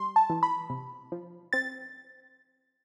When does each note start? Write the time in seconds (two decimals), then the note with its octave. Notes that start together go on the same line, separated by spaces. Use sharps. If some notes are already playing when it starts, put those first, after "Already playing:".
Already playing: G3 C6
0.16 A5
0.30 E3
0.43 B5
0.70 C3
1.12 F3
1.53 C4 A6